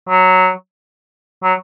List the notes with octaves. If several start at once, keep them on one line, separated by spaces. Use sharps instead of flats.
F#3
F#3